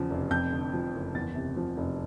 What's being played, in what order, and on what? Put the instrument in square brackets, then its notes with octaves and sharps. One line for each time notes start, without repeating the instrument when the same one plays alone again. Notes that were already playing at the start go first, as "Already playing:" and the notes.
Already playing: [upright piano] E2 C#3 F3
F1
F2 G6
D3
F3
F#1
E2 A6
C3
F3
F1